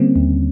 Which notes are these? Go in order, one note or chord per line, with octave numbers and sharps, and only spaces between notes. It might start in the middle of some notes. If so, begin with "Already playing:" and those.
Already playing: D3 G3 A#3 C4 C#4
D#2